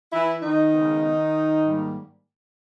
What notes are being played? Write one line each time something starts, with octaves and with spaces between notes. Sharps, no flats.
E3 E4
D#3 D#4
C#3 G#3 B3
G#2 G3 A#3